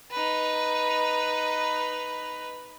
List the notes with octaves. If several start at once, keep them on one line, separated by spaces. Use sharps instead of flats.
D#4 B4